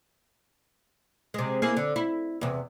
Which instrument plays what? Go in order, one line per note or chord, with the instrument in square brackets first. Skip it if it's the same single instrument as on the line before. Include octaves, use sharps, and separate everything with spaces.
[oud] C3 G#3
A#3 E4 G#4
D3
E4
E2 C3